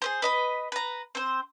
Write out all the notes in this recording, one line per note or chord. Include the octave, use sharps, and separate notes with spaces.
G#4 B4 C5
B4 D#5 B5
B4 A#5
C4 C5